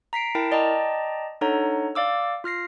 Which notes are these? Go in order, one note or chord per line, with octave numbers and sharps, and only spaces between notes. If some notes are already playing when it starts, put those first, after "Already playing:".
A#5 B6 C7 D7
E4 A#4 G5 A5
D5 D#5 G5 A5 A#5
D4 D#4 A4 C#5 F#5 A#5
D5 F5 D6 E6
F4 F6 A#6 C7